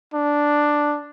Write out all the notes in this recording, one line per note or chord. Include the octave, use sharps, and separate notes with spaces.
D4